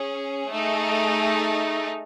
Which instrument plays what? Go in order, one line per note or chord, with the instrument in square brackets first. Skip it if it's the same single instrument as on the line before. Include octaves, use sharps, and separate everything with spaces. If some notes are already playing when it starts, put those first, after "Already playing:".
Already playing: [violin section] C#4 G#4
A3 D#4 G#4